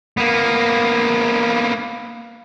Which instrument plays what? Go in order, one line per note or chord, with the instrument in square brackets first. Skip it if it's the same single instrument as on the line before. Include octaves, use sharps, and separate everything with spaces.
[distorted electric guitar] A#3 B3